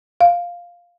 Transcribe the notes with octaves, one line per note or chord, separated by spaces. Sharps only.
F5